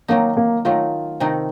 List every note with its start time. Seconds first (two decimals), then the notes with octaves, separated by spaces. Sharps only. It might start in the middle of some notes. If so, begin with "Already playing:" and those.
0.08 D#3 F#3 A3 A#3 D#4
0.37 A#3
0.65 D#3 F#3 A3 D#4 F4
1.20 C3 D#3 A3 D#4